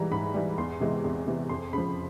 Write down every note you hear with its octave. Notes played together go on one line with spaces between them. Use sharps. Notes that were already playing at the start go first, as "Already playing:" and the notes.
Already playing: G#2 E3 G3 A#5
G#2 B5
E3 G3
E2 C6
C3 E3 G#3
E2
C3 E3 G#3
F2 C6
C#3 F3 B5